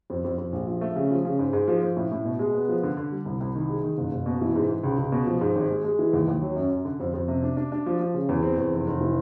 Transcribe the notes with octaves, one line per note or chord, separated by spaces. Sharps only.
F2
F2
F2
A#1
F3
A3
C#3
F3
C#3
G#2
G#2
F3
F3
A2
A2
B2
G#3
B3
F3
D3
D3
G3
C2
C2
D#3
G#3
D#3
F#1
F#1
B2
E3
G#2
G#2
C#2
C#2
B2
F3
G#2
G#1
G#3
G#3
E3
D#2
D#2
F#3
F#2
F#2
D3
F2
F2
C3
D4
D4
D4
F3
F3
C#3
E2
C4
E2
F1
F1
E3